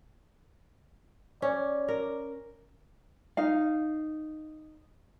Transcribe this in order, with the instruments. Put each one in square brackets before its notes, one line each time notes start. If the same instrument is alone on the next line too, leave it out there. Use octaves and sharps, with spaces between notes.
[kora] C#4 [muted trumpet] D5
[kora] A#4
[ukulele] D#4 F5